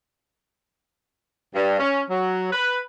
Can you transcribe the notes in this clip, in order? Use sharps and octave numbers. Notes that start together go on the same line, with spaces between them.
G2
C#4
F#3
B4